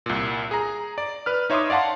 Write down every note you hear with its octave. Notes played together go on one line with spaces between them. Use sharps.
C2 A#2
G#4 A#5
D5
B4 F6
D#4 C#5 E5 C6 D6 D#6
D5 F5 F#5 A5 C6